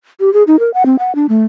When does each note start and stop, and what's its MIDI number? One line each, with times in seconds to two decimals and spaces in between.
0.20 0.32 67
0.34 0.43 68
0.47 0.59 63
0.59 0.73 70
0.74 0.86 78
0.86 0.96 60
0.99 1.15 78
1.15 1.26 62
1.29 1.45 57